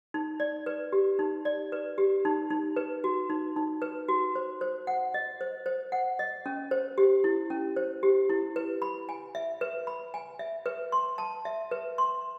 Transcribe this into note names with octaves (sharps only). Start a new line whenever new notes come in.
D#4
D5
B4
G4
D#4
D5
B4
G4
D#4
D#4
B4
F#4
D#4
D#4
B4
F#4
C5
C5
F#5
D#5
C5
C5
F#5
D#5
C#4
C5
G4
E4
C#4
C5
G4
E4
B4
B5
G#5
E5
B4
B5
G#5
E5
B4
C6
A5
E5
B4
C6